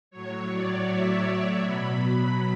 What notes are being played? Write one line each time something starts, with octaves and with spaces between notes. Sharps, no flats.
A2 F#3 C#5
D5
E5
B2 F#3 B5